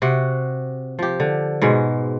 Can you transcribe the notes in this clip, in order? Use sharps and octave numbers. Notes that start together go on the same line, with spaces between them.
C3 F#4
F3 G4
D3
G#2 B2 G#3